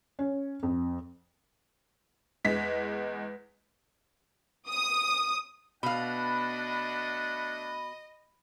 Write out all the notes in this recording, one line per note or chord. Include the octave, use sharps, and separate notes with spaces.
C#4
F2
E2 G#3 B6
D#6
B2 A3 D4 D#5 F5 F#5 B5